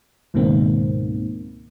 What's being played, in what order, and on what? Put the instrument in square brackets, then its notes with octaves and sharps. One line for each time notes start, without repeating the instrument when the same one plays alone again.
[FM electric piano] C#2 G#2 B2 D#3 A#3 C4